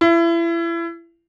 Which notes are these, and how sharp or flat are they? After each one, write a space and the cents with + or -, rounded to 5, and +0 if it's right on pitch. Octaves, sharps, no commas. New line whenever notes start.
E4 +30